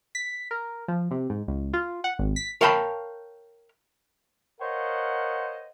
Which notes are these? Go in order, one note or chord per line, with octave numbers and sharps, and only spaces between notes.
B6
A#4
F3
C3
G#2
C#2
F4
F#5
G#1
B6
A#4 C#5 F5 G5 A5 B5
A#4 C5 C#5 D#5 F5 F#5